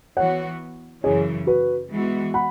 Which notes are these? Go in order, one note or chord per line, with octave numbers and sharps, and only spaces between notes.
E3 B3 F#4 C#5 F#5
F#2 C#3 E3 G#4 C#5
F#4 B4
E3 G#3 B3 F#4
F#5 B5